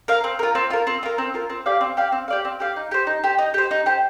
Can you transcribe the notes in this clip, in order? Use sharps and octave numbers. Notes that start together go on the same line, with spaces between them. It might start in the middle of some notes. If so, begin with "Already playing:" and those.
A#4 F5
C4
F4 A#4
C4
F4 A#4
C4
F4 A#4
C4
F4 A#4
C4
G4 D5 F5
C4
G4 D5 F5
C4
G4 D5 F5
C4
G4 D5 F5
D#4
G4 C5
D#4
G4 C5
D#4
G4 C5
D#4
G4 C5